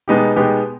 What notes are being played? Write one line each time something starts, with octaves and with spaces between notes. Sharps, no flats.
B2 G#3 B3 D#4 G4
B2 G#3 B3 D#4 G4